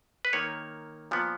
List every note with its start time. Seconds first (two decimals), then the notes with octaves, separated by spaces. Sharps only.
0.25 B4
0.33 D#3 A#3 C#5
1.11 A#2 F3 B3